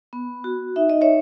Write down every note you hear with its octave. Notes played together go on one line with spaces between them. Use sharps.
B3
F#4
D#4 E5
D#5
C#5 E5